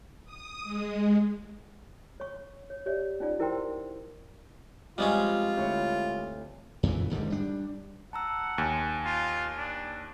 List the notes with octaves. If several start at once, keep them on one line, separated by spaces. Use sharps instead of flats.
D#6
G#3
C#5 C#6
C#5
G4 C#5 D5 E5
C#4 D#4 F4 D5
E4 A#4 C5 F#5 G5 C6
F2 G3 G#3 C#4 F4
D2 E4 C#5
F2 A#2 C#3 E3
D#1 G#2 D3 G3
G3 D4
F#5 A5 A#5 E6
D#2 G#5 C#7
F4
D4